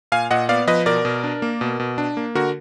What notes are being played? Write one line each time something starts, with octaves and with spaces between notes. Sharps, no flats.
A#2 F5 G#5
A#2 D#5 F#5
B3 D5 F5
F3 B4 D#5
B2 A#4 D5
B2
D4
A#3
B2
B2
D4
A#3
D3 F#4 A#4